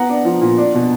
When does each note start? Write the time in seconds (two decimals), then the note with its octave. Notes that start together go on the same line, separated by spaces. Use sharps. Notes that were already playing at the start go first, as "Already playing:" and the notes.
Already playing: B3 F#5 A#5
0.10 D4
0.25 F3
0.41 A#2
0.58 D4
0.74 B2